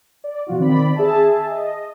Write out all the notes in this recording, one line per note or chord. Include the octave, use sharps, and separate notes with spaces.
D5
B2 F3 F4 F#4
D#3 C4 D5 B5
G#4 E5 A5
D#5